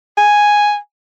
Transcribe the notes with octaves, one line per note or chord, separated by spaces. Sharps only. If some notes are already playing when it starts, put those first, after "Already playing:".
G#5